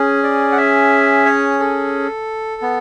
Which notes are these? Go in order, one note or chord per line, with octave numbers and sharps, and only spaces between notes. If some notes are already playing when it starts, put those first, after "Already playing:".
Already playing: C#4 G#4
D5
F#5
E5
C#5
A4
B3